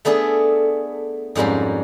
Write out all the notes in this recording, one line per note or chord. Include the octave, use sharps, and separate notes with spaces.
A3 B3 D4 G#4 A4
F2 G#2 G3 A#3 C#4